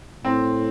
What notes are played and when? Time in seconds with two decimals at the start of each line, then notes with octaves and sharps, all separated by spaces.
0.24 A2 C4